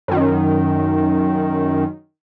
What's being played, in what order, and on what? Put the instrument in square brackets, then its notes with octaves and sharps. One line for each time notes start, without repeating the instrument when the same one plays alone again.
[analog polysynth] F#2 D#3